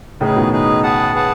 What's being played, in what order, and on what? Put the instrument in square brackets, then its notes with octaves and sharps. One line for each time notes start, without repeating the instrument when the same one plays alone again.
[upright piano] A2 C#3 [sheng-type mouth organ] D#4 G#4 B4
[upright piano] B2 D#3
[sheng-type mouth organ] D#4 G#4 B4
G#4 B4 F#5 A5
G#4 B4 F#5 A5